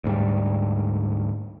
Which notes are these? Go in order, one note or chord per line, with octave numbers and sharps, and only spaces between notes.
D2 G#2 G3